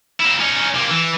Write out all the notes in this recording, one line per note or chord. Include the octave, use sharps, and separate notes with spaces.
A#3 E4
C#4 D#4
C3 A#3
E3